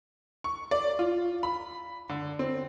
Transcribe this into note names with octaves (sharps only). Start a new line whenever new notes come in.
C#6
D5
F4
B5
D3
C4